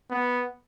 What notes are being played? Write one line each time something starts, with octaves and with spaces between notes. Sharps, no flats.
B3